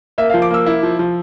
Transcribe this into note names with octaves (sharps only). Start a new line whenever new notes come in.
A#3 E5
F3 F5
D6
A#3 E6
E4
F3
F3